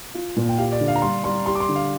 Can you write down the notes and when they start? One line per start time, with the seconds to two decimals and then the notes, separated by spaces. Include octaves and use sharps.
0.15 F4
0.36 A#2
0.49 G5
0.58 G4 F5
0.72 D5
0.81 D3
0.88 F5
0.96 A#5
1.02 G3 C6
1.24 G3 C6
1.46 G4 C6
1.55 D6
1.60 C6
1.69 D3
1.76 F5